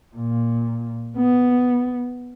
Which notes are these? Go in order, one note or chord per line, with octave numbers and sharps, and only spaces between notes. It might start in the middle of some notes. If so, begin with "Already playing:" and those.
A#2
B3